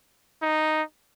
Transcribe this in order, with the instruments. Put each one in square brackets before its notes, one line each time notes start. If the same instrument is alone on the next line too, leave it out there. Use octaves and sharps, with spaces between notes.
[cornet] D#4